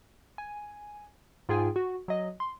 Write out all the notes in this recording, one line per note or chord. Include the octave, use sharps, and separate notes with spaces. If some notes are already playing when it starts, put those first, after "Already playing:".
G#5
G#2 F4 G#4 G5 G#5
F#4
F#3 D#5
C6